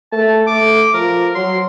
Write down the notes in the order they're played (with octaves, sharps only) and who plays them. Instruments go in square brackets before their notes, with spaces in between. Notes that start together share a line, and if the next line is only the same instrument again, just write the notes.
[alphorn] A3 [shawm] A5
[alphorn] A3 [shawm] D6
[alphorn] F3 [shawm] A#4
[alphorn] F#3 [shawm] C6